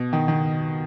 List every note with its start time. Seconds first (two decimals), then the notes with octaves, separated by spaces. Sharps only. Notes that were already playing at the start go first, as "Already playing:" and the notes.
Already playing: B2
0.13 D#3
0.28 D#3